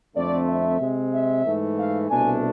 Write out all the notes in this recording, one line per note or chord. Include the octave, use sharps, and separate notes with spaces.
F2 D3 A3 C4 D5
E5
C3 G#3 C4
E5
G#2 E3 A3
F5
C2 B2 A3 D4 G#5